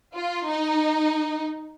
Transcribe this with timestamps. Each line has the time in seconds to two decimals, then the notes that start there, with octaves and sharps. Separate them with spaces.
0.16 F4
0.50 D#4